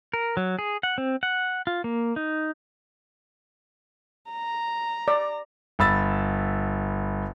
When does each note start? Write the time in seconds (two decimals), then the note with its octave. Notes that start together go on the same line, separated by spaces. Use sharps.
0.14 A#4
0.37 F#3
0.59 G#4
0.83 F#5
0.98 C4
1.23 F#5
1.67 F4
1.84 A#3
2.16 D#4
4.31 A#5
5.08 D5
5.79 G1 B5 E6 A6